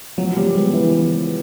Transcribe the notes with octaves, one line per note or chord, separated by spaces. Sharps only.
F3 F#3
G3
G#3 B3
E3
F3